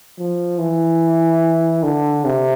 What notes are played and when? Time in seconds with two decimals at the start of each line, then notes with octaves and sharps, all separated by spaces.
0.19 F3
0.59 E3
1.83 D3
2.25 C3